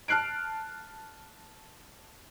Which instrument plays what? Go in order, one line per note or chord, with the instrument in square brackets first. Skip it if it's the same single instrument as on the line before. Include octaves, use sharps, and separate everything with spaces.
[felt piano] A5 F6 F#6 C7 D7